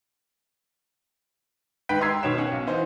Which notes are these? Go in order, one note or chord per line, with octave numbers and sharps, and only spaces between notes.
G#2 D#3 B4 G5 B6
D#5 A#5 C6 E6 G#6 C7
B2 D#3 C#5 G5 E7
C#4 F#5
B1
E3 D#4 C5